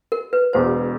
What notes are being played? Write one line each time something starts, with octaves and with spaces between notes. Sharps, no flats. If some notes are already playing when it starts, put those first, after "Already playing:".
A#4
B4
E1 E2 B2 G#3 C5